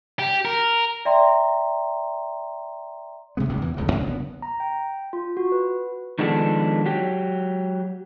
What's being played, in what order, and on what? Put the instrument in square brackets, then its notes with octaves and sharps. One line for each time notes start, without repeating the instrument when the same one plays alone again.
[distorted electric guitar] G4
A#4
[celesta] D5 E5 G5 A#5 C6
[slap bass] G2 C3 G#3 B3
F#1 C#2 G#2 B2
E2 E3
D#1 C#2 G2 C#3
C#2 B2 D3 D4
F#1 C#3 B3
[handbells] A#5
G5
F4
F#4
B4
[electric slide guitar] D#3 F3 G#3 B3 D4 A4
F#3 G4